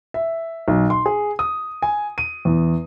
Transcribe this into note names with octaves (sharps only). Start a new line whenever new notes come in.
E5
B1
C6
G#4
D#6
G#5
D#7
E2